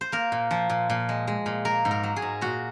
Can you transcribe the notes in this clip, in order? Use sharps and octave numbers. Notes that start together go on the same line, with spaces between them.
C5
A#3 A#4
A#2
F3
A#2
A#2
G#3
G#3
A#2
A#3 A#4
G#2
A#4
F#3
G#4
G#2
A#2 F#4